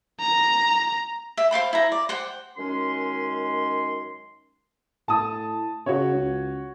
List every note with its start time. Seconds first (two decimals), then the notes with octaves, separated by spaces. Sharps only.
0.20 A#5
1.37 E5
1.51 C5 F5 G5 B5
1.73 E4 A#5
1.92 D5
2.09 C5 F#5 G5
2.57 F#2 D#3 G#3 C#4 C6
5.08 A2 A5 D#6
5.86 C#3 F#4 C#5
6.15 C#2